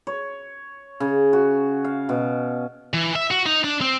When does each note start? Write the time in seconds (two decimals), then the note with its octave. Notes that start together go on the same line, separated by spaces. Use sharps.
0.07 C#5
1.00 C#3
1.33 F#4
1.84 F5
2.09 B2
2.94 E3
3.16 E5
3.31 F#4
3.46 D#4
3.64 D4
3.81 C4